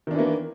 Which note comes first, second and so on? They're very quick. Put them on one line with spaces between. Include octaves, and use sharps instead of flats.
D#3 D4 E3 A#3